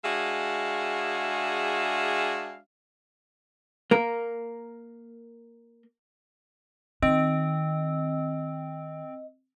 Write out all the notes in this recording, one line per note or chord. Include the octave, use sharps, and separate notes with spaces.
G#3 D4 F#4 G#4 E5 F5
A#3 A#4
D#3 C4 D#5